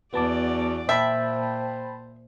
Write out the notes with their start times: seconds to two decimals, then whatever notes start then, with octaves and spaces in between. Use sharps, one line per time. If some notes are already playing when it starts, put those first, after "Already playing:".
0.14 E2 B3 F#4 D5 A5 D6
0.89 A#2 C5 E5 G5 A5 B5